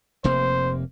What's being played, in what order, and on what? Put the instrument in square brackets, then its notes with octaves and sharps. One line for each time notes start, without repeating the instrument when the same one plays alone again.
[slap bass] F1 C3 A#3 [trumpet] C5